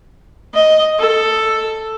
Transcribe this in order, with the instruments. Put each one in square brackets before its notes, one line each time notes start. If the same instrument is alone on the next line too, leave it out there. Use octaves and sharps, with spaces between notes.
[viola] D#5
A4